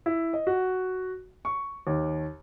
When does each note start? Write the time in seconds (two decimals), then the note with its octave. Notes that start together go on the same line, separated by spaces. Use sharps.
0.06 E4
0.33 D#5
0.47 F#4
1.45 C#6
1.87 D#2